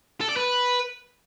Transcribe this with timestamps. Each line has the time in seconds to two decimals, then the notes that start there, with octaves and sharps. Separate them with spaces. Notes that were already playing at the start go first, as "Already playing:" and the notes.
0.21 A4
0.29 D5
0.37 B4